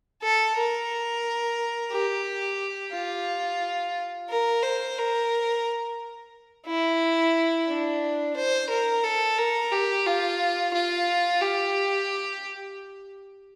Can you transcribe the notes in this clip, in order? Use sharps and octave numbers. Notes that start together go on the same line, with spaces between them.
A4
A#4
G4
F4
A#4
C5
A#4
E4
D4
C5
A#4
A4
A#4
G4
F4
F4
G4